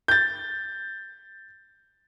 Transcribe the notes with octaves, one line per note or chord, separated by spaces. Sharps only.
G6 A6